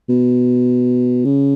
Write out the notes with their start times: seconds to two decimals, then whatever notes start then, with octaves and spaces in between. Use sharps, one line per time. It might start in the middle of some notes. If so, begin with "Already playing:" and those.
0.09 B2
1.25 C#3